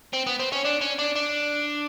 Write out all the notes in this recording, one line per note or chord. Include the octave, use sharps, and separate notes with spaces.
C4
B3
C4
C#4
D4
C#4
D4
D4